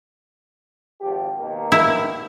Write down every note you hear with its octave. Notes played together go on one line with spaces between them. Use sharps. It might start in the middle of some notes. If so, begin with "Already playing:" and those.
G#1 F3 G4
D#2 B2 A#3
E4